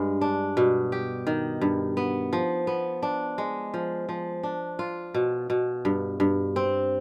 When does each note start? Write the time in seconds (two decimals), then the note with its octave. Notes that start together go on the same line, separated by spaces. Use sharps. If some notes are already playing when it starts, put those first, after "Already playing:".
Already playing: G2 G#3
0.21 D4
0.57 B2
0.92 G4
1.27 D#3
1.61 G2
1.97 B3
2.33 F3
2.67 B3
3.03 D4
3.38 G#3
3.74 F3
4.09 F3
4.43 D4
4.79 F4
5.14 B2
5.50 B2
5.85 G2
6.20 G2
6.56 C4